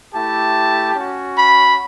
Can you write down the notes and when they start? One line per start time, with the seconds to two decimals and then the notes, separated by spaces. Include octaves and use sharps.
0.13 A3 E4 G4 A5
0.96 C#4 F#4
1.38 B5